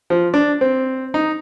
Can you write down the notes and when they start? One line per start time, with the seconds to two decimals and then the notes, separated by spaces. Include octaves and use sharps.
0.10 F3
0.34 D4
0.61 C4
1.14 D#4